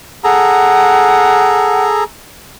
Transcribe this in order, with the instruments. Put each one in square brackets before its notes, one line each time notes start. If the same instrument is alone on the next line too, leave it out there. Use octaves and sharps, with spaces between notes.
[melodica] G#4 A4 A#5 [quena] F#5